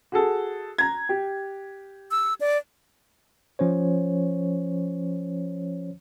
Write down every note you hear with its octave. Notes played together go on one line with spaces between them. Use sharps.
F#4 G#4 A4
A#5 G#6
G4
E6
D5
F3 C#4 C5 C#5